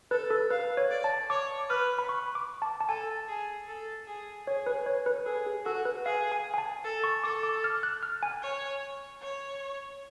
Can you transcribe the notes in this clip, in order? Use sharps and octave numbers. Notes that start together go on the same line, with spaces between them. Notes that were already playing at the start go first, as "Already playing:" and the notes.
A4 B4
A4
B4 F5
C#5
D5
A5
C#5 D6
B4 F6
B5
C#6
D6
A5
A5
A4 G#5
G#4
A4
G#4
G#4 C#5
B4
C#5
B4
G#4 A4
G#4
F#4 A4
B4
G#4 F5
G#5
G#5
A5
A4
C#6
A4 D6
D6
F6
F#6
F6
G#5
C#5
C#5